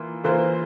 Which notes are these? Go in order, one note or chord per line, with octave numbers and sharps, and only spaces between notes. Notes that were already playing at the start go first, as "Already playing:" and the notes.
Already playing: E3 A#3 F4
E3 A#3 F4 C5